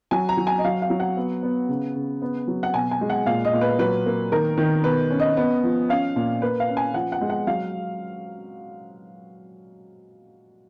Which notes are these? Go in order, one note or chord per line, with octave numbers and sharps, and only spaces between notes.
F#3 G#5
A#5
F#3
G#5
D#5
F#3 F5
F5
F#3
F#5
B3
B3
C#3
C#3
B3
F#3
F#5
B2 G#5
G#5
G#3
F#5
A#2 F5
D#5
A#2
B4
F#3 B4
A#3
D#3 A#4
D#3
B2 B4
C#4
D#5
B3
F3
C#4 F5
A#2
A#3 B4
F5
C#4
G#5
F3 F#5
F#5
G#3
F#5
F#3 F5